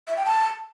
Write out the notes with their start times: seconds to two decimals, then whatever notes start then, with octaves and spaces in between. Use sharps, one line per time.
0.08 E5
0.17 G5
0.25 A5